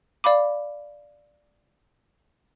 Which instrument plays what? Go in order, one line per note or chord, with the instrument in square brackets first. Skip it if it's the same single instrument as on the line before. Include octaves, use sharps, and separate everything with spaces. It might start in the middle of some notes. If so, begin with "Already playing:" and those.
[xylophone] D5 F5 B5 D6